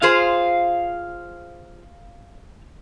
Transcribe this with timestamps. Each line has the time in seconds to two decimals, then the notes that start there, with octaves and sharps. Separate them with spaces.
0.02 F4 G#4 C5 F5